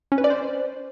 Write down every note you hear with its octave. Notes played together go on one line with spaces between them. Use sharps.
C#4
B4
D5
C5